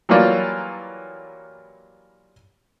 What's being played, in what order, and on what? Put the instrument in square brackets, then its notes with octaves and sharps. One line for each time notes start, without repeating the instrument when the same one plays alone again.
[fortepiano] E3 F#3 G3 A#3 F4 D5